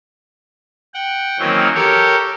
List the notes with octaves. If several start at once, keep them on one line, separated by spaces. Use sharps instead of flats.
F#5 G5
D#3 E3 F#3 A#3 C4 C#4
G4 A4 A#4 C#5